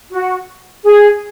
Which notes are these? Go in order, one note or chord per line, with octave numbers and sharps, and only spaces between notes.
F#4
G#4